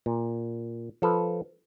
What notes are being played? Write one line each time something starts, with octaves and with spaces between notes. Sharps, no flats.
A#2
F3 A4 B4